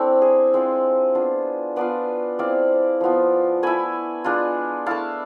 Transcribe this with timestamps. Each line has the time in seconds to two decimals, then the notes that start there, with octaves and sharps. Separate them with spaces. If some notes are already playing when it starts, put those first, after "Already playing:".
Already playing: A3 C4 D4 E4
0.22 G#4
0.54 G#3 C4 F4
1.15 B3 D4 F4
1.76 B3 D4 F4 B4 D5
2.39 G#3 C4 E4 D5 F5
3.01 F3 B3 F4
3.63 A3 E4 G#5 B5
4.24 G#3 D4 F4
4.86 A3 E4 F5 A5